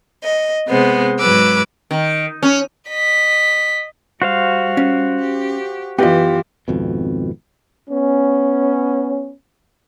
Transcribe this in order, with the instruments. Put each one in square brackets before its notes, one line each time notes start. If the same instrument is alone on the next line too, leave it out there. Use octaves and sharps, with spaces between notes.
[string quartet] D#5
C3 G#3 B3 C5
G#2 F#3 B4 D6 E6
[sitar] D#3
C#4
[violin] D#5 B6
[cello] G3 [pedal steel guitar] F#4 C5 F5
[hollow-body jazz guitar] C#4
[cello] G4
[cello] F#2 E3 [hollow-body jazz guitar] B3 D#5 [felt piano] F4 G4
[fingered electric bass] G#1 F2 B2
[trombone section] B3 C#4